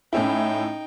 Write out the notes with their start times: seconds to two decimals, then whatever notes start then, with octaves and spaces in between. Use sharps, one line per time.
0.13 A2 C#4 D#4 E4 G5